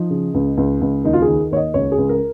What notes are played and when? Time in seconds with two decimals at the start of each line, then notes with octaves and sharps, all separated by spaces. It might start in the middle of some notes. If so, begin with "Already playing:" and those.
Already playing: F3 D#4
0.11 C#3
0.34 C#2
0.57 C#2
0.81 C#2
1.04 D#2 D#4
1.13 F4
1.22 G#4
1.28 D#3
1.51 D#2 C#5
1.57 D#5
1.74 C#2 C#5
1.92 G#4
1.98 C#2
2.09 A#4